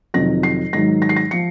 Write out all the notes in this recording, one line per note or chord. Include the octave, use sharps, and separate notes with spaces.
F2 C3 D#3 F#3 A#6
C7
G#2 D#3 F#3 A#6
A#6
C7
A#6
F3 C#7